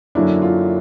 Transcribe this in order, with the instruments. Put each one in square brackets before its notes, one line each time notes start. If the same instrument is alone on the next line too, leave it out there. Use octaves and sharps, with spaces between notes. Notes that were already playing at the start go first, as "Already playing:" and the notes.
[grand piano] F#2 D3 F#3 A#3 D4 [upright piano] E4
[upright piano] F4